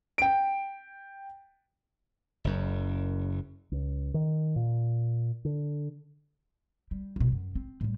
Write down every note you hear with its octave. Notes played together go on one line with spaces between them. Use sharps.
G5 D7
F#1 F#2
C#2
D#3
A#2
D3
G3
C2 B2
F#2
C4
A2 G3